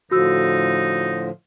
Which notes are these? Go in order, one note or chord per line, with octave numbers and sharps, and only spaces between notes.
A2 D3 F3 D#4 F#4 E6